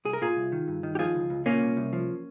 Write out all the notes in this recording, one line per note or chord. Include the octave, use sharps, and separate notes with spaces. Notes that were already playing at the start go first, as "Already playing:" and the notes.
C2 G#4
A#4
A#2 F4 G#4
C2
D#3
G2
D#3
G4
F3 F4 G#4
C#2
C#2
A#2 A#3 C#4
C2
C2
F3